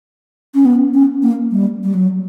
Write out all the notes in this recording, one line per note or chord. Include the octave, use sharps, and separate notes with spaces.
C#4
B3
C#4
A#3
G3
G3
F#3